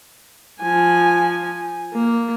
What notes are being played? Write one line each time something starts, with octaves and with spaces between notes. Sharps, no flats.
F3 G#5
A#3